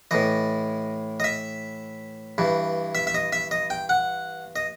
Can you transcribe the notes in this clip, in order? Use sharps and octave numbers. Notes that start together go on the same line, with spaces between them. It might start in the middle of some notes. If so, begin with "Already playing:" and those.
A2 E3 D#5
D#5
E5
G2 E3
E5
E5
D#5
E5
D#5
G5
F#5
D#5